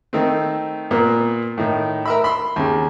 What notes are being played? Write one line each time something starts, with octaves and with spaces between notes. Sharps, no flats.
D#3 A3 C4
A#2 A#3 B3
A2 D#3
A#4 E5 B5
B5 C6
D#2 C#3